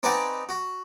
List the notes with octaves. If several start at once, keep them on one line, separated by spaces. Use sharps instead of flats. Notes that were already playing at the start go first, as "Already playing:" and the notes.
C4 D#4 G#4 B4 D5 F#5
F#4